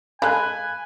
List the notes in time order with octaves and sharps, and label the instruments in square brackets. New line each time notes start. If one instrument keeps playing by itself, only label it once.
[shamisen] G#3 A4 F5 [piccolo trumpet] G#5 [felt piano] B5 F#6